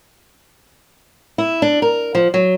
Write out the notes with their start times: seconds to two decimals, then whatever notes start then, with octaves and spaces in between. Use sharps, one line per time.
1.38 E4
1.62 D4
1.82 A#4
2.15 F3
2.34 F#3